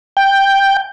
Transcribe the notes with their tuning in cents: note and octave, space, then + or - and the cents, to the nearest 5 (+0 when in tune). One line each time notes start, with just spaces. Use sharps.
G5 +5